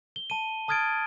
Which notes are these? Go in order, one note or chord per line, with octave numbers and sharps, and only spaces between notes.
G7
A5 D#7
A5 D#6 F6 G#6 A6 D7